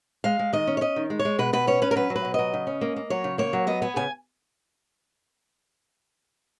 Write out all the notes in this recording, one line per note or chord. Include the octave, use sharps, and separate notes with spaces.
G#3 F5
G#3
D#3 D#5
C#4
C#5
C#4 D#5
D#3
G#3
C#5
G#3
B2 B4
B2 B4
C#4 C#5
C#4 B4
A#4
F#3 B4
F#3
B4
B2
F#3 D#5
C#3
C#4
A#3
A#3
F#3 C#5
C#3
A#3 C#5
F#3
B3 D#5
B3 G#5
C#3 G#5